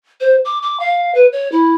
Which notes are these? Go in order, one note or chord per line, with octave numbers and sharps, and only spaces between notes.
C5
D6
D6
F5
B4
C#5
E4